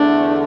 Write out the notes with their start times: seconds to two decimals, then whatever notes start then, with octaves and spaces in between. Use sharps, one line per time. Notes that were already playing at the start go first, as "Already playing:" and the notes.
Already playing: E2 D3 A3 D4